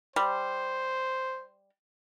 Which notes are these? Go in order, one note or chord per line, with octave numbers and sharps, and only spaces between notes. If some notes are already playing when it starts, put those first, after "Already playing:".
G3 C5